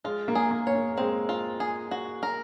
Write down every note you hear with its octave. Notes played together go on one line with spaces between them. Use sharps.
G#3 F4
A#3
G#4
A#3
C#5
A#3
G#3 C4
F4
G#4
F#4
A#4